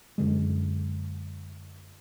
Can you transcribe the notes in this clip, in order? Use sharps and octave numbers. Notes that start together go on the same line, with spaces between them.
F#2 D3 G#3